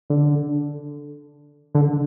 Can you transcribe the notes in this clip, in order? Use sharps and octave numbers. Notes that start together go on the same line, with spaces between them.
D3
D3